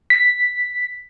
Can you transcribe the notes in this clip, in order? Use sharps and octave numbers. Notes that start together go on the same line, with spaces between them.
B6